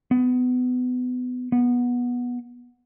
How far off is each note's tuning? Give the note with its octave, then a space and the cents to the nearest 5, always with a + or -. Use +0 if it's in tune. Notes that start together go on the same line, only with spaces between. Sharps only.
B3 +25
B3 -15